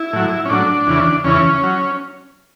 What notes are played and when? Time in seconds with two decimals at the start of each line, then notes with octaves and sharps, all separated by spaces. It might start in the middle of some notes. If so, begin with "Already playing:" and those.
Already playing: E4
0.13 A2 F#3
0.45 C#4
0.49 A2 F#3 D4
0.87 E2 C#3 E3
1.24 E2 C#3 E3 C#4
1.63 F#3